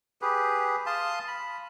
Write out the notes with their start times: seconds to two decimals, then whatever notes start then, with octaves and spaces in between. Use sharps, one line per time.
0.22 G4 G#4 B4
0.86 F5 A5 C6 D#6
1.27 B5